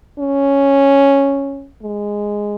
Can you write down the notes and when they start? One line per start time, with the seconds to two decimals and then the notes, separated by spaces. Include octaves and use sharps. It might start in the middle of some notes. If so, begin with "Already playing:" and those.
0.19 C#4
1.83 G#3